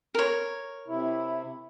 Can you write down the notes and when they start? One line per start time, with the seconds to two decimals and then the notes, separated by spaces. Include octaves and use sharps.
0.15 A#4 C#5
0.88 C3 E4